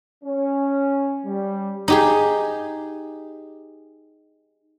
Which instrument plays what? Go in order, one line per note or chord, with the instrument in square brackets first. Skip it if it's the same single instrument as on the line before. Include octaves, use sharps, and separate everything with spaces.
[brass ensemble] C#4
G3
[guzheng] D#4 G4 G#4